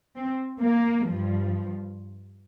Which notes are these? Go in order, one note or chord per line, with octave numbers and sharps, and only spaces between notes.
C4
A#3
G2 F3